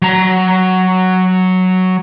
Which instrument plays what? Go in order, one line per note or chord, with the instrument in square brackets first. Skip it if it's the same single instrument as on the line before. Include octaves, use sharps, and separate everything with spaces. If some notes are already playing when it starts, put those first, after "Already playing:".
[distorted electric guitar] F#3 A#5